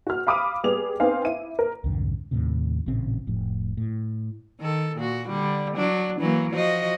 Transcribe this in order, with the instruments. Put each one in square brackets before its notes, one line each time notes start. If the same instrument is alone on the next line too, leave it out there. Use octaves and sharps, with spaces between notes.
[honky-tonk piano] F#4 F6
F5 B5 D6 D#6 F6 D#7
G3 B3 G#4 F7
B3 C4 D#4 F5 G#5
E4 D#7
A#4
[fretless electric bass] C2 F2 G#2 D3
D#2 A2 C3
A1 A#2 C#3 C4
F1 A2 F3
A2
[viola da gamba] D#3 A4
A#2 F#4
D3 G3
F#3 D4
E3 F#3 A#3
F3 F#4 D#5